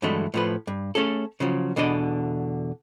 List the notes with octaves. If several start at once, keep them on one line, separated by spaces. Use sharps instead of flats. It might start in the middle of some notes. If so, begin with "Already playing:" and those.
G2 D3 E3 F#3 G#3 A3
A2 F3 B4
G2
A3 C#4 G#4 A4
C#3 F3 F#3
E2 B2 D3 D4 G4 D#5